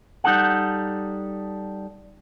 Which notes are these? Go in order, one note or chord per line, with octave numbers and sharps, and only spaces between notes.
G3 D#4 A4 F#5